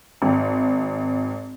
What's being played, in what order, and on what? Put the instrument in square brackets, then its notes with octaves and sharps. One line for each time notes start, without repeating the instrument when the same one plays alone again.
[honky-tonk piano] G#1